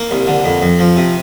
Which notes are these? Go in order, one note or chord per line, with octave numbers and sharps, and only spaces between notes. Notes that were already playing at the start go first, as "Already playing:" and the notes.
Already playing: A#3
C2
D3
F2
F2
F3
C3